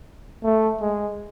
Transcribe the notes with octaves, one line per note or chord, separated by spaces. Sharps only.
A3
G#3